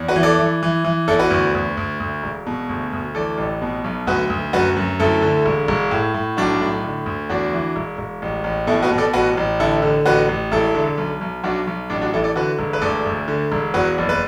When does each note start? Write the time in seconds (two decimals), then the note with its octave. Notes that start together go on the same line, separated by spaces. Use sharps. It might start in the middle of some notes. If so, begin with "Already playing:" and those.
Already playing: E2
0.08 F#4 B4
0.16 E3
0.23 A4 D5
0.39 E3
0.63 E3
0.85 E3
1.07 E2 E4 A4
1.19 F#4 B4
1.30 D2
1.55 D2
1.77 D2
2.00 D2
2.23 E1
2.47 B2
2.69 D2
2.93 D2
3.15 E3 A4 D5
3.38 A1
3.62 B2
3.84 B1
4.07 D2 F#4 B4
4.30 D2
4.53 F#2 F#4 B4
4.76 F#2
5.00 D2 E4 A4
5.22 D3
5.46 E1
5.68 E1
5.91 A2
6.14 A2
6.37 B1 D4 F#4
6.61 A2
6.84 D3
7.06 D2
7.29 E2 D4 F#4
7.53 E3
7.76 E1
7.98 E1
8.22 A1
8.44 A1
8.67 B2 E4 A4
8.83 F#4 B4
8.91 B2
8.98 A4 D5
9.14 A1 F#4 B4
9.37 A1
9.60 D3 E4 A4
9.82 D3
10.06 A1 F#4 B4
10.29 A1
10.51 E1 E4 A4
10.75 D3
10.97 B1
11.21 B1
11.43 B1 D4 F#4
11.67 B1
11.90 A1 D4
12.02 D4 F#4
12.13 E3 E4 A4
12.24 A4 D5
12.36 D3 F#4 B4
12.59 E1
12.73 B4
12.82 D2 A4 D5
13.06 D2
13.28 D3
13.52 E1
13.74 E2 F#4 B4
13.98 F#1
14.09 B4